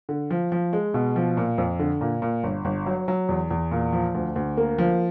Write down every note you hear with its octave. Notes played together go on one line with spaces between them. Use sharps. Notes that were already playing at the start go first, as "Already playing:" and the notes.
D3
F3
F3
G#3
B2
F3
A#2
F2
D3
A#2
A#2
G1
G1
F#3
F#3
E2
E2
A#2
F3
D2
D2
A#3
F3